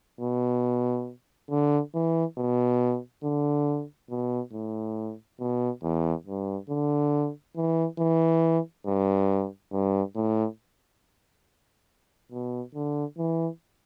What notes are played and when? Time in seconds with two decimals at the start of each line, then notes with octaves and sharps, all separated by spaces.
0.21 B2
1.50 D3
1.94 E3
2.38 B2
3.23 D3
4.10 B2
4.53 A2
5.40 B2
5.83 E2
6.27 G2
6.69 D3
7.56 E3
7.99 E3
8.86 G2
9.72 G2
10.16 A2
12.32 B2
12.75 D3
13.18 E3